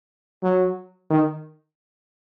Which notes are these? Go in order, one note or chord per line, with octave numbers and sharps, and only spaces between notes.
F#3
D#3